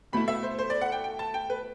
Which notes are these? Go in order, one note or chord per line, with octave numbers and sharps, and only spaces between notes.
B2 A3 E4 B5
E5
C5
C5
D5
F#5
G5
G5
A5
G5
B4